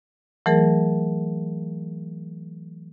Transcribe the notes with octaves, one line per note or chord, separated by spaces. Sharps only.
E3 F#3 A3 G#4 A#4